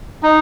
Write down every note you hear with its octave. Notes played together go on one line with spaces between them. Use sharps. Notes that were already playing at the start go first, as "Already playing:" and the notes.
D#4